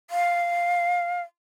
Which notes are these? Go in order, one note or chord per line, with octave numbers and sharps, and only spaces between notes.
F5